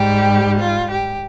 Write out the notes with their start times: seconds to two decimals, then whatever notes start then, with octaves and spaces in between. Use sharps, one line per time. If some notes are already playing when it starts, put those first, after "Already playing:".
Already playing: G#2 G3 G4
0.61 F4
0.91 G4